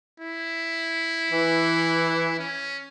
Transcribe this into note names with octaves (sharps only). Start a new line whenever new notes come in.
E4
E3
C#4